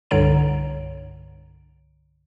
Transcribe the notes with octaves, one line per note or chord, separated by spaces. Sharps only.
C2 G2 D3 C#5 A#5 D7